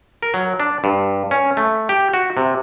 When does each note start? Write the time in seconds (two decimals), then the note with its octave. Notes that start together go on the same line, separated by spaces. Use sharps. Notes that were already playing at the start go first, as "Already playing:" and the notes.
0.23 A#4
0.34 F#3
0.60 D4
0.84 G2
1.31 C#4
1.57 A3
1.89 G4
2.14 F#4
2.37 C3